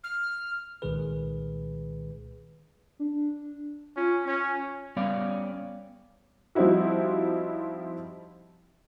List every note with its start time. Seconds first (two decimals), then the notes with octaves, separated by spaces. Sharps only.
0.04 F6
0.82 C2 A#2 D#3 G#3 G#4 B4
2.99 D4
3.96 C#4 F4
4.27 C#4
4.96 G3 B3 C#4 D5 F5
6.55 F3 G3 C4 D#4 E4 F#4